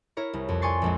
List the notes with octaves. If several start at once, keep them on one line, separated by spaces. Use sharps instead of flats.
E4 A#4 C#5
C2
F2
D5 G#5 C6 C#6 A6 C7
A#1 F2 G#3